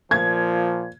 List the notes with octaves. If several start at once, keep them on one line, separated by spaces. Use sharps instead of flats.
A#2 F3 G#6